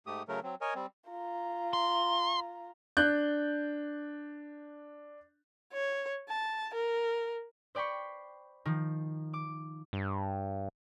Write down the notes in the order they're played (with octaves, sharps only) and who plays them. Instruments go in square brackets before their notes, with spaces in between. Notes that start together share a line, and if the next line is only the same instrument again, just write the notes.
[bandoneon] G#2 A3 G4 D#6
C#3 F#3 A3 A#4
F#3 C4
A#4 C#5 D#5 G#5
G3 C4
[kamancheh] F4 A#5
[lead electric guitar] C6
[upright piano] D4 F#6 G6
[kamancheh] C#5
A5
A#4
[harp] C5 D5 G5 B5 C#6
D#3 F3
D6
[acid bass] G2